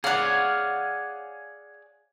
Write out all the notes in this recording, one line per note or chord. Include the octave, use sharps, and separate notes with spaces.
G#4 C#5 D5 F5 F#5